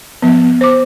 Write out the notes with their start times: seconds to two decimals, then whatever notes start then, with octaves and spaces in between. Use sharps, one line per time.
0.22 F3 B3
0.61 C5 D6